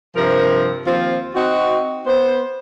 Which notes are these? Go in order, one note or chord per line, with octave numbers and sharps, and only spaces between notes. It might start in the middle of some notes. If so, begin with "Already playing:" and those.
G2 C3 F3 A#4
D#2 F3 C4 F4
C4 D#4 F#4
B3 C5